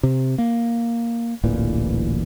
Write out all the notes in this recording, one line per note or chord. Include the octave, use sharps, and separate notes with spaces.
C3
A#3
D1 A1 A#2 E3